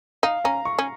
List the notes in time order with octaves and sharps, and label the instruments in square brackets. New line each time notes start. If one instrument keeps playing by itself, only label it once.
[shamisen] D#4 [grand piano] F5
[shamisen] C#4 [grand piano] A#5
[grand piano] C#6
[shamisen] C#4